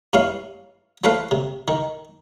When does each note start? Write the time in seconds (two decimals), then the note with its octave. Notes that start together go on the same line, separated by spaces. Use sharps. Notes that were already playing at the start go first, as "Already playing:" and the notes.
0.13 G2 C#4 E4 F5
1.04 E3 A3 E4 B4 C5 F5
1.31 C3
1.68 D#3